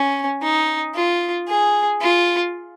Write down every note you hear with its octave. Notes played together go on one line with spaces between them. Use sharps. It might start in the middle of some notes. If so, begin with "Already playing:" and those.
Already playing: C#4
D#4
F4
G#4
F4